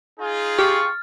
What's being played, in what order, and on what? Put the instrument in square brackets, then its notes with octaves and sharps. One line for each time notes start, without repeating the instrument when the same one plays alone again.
[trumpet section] D#4 F4 G#4
[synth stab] G4 [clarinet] C#6 [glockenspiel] F6 A6